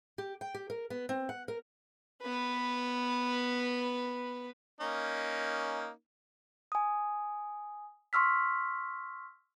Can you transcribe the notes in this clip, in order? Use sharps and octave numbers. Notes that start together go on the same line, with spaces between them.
G4
G5
G4
A#4
B3
C4
F#5
A#4
B3 B4
A#3 C#4 D#4
G#5 D#6
C6 C#6 E6 F6 B6